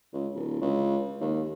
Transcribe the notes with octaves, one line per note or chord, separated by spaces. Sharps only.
C#2
D1
C#2
D#2